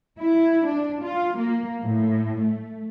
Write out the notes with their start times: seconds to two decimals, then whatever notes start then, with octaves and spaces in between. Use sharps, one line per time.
0.18 E4
0.66 D4
1.02 F4
1.38 A#3
1.82 A2
2.41 A3